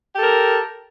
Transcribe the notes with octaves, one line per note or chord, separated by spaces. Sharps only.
G4 A4 A#4